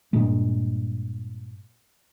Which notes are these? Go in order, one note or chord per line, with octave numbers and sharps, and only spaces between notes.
G2 A#2 G#3